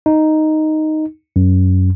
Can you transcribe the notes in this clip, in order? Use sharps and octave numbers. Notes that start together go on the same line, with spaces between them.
D#4
F#2